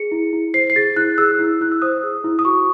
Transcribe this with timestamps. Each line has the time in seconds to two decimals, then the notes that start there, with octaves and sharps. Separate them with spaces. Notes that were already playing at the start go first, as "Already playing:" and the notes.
Already playing: G#4 C#7
0.12 E4
0.33 E4
0.54 C5 C7
0.70 C7
0.76 G#4 A6
0.96 E4 F#6
1.18 G#4 E6
1.39 E4
1.61 E4 F#6
1.72 E6
1.82 C5 D#6
2.03 G#4
2.24 E4
2.39 D#6
2.45 F#4 C#6